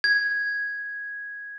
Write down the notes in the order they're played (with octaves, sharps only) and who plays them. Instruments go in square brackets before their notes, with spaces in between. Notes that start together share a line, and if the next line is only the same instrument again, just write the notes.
[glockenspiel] G#6